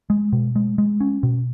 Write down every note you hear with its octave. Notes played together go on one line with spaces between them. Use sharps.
G#3
B2
G#3
G#3
C#4
B2